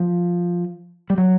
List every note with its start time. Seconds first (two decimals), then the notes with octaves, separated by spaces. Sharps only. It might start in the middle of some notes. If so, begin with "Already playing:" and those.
Already playing: F3
1.10 G3
1.18 F#3